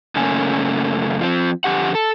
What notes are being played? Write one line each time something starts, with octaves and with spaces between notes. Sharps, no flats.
F#2 C#3 A3 A#3 C#4 G#5
F3 C4
F2 D3 G4 F#5
A4